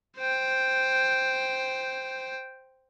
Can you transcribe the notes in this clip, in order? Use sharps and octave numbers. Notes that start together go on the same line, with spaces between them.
C5 G5